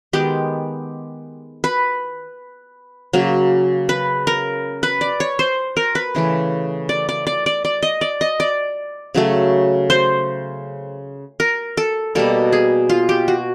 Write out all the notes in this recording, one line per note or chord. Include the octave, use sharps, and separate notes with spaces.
D#3 G#3 B3 G4
B4
C#3 F#3 A#3
B4
A#4
B4
D5
C#5
C5
A#4
B4
C#3 E3 A3
D5
D5
D5
D5
D5
D#5
D5
D#5
D5
C#3 F#3 A3
C5
A#4
A4
B2 G3 A#3 A4
G#4
F4
G4
F#4